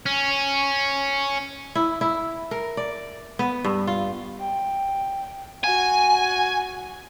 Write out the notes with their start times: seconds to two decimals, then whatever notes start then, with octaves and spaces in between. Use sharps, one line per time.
0.06 C#4
1.75 E4
2.01 E4
2.51 A#4
2.77 D5
3.39 B3
3.64 G2
3.87 F4
4.40 G5
5.64 F#4 G#5